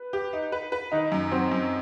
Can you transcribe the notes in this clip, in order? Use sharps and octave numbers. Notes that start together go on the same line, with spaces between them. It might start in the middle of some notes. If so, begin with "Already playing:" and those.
Already playing: B4
G4
D#4
B4
B4
D#3 D#4
F#2
F#3 C4
F#2